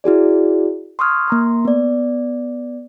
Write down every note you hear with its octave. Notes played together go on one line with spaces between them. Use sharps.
E4 F#4 G#4 D5
C6 C#6 D#6 F6 F#6 G#6
A#3 A#5 C6
B3 D5